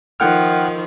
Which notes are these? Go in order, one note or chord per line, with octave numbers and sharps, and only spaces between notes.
D#3 F3 F#5 G5 F6